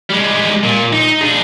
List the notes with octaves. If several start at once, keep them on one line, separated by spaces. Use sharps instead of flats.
G3 G#3
A#2
D#4
D4 G#4